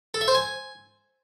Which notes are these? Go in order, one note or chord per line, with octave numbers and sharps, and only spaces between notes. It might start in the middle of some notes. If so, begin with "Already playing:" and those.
A4
E5
C5
G#5